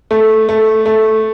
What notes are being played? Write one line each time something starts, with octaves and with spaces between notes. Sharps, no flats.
A3
A3
A3